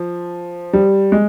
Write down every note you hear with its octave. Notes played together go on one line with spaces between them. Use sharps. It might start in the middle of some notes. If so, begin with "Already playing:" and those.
Already playing: F3
G3
G#3